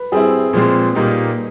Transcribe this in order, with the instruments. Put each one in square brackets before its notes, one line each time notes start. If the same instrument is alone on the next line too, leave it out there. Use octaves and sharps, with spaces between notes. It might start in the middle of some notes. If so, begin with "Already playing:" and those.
Already playing: [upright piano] B4
[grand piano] G3 C4 E4 [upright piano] G#4
[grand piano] A#2 F3 G#3 C4
A#2 G3 A#3 D#4 G4